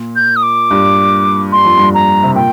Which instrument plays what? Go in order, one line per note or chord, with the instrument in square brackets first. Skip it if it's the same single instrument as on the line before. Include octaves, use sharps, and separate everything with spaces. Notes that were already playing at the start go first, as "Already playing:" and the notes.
Already playing: [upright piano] A#2
[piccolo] G6
D#6
D6
[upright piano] G2
[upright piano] G2 [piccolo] C6
[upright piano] F2
G2
[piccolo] A#5
[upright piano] C3
[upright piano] A#2 [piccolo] G5